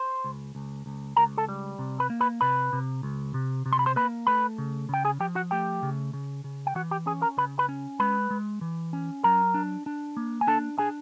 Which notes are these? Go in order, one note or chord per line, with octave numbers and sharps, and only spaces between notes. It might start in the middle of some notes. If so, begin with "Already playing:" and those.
Already playing: C5 C6
C#2
C#2
C#2
C#2 A#4 A#5
A4 A5
G3
C3
B4 B5
A#3
B4 B5
C3 B4 B5
C3
C#2
C3
C3
C6
B5
C5 C6
A#3 B4 B5
A3 B4 B5
C#3
C#3 G5
G#4 G#5
F3 G4 G5
F#4 F#5
A3 G4 G5
C#3
C#3
C#3
G5
E3 F#4 F#5
G4 G5
C#4 G#4 G#5
A#4 A#5
C#3 B4 B5
B4 B5
C#4
G#3 B4 B5
G#3
E3
C#4
F#3 A#4 A#5
D4
D4
A#3
G#5
D4 A4 A5
D4 G#4 G#5